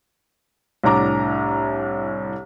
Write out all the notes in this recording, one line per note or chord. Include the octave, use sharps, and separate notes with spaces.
C2 A2 D4 A#5 D6